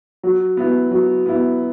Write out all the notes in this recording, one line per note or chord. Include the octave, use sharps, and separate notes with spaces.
F#3
B3 E4
F#3
B3 E4